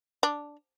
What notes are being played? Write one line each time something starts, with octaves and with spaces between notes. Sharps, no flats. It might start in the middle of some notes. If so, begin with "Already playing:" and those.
D4